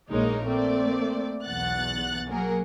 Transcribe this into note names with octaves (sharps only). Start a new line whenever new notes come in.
A#1 G#3 A#3 D#4 A#4 C#5
A3 A#3 C4 D5
B1 E2 F#5 F#6 A6
F#3 A#3 G#4 A#4 F#5